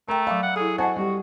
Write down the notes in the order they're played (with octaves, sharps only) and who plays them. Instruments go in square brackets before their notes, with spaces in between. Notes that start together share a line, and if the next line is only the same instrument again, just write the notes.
[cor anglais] A3 [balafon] A#4 G5 [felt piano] A#5
[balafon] F#3 E5 B5 [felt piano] F5
[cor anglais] F#5
[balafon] E4 A4 [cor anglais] G#4
[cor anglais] F#4 [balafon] C5 D#5 [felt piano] F#5 G#5 A5
[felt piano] G3 [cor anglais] F#4